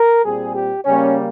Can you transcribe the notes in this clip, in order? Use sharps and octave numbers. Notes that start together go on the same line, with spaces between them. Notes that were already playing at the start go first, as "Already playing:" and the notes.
Already playing: A#4
A#2 G3 C4 G#4
G4
C#3 G3 A#3 C#4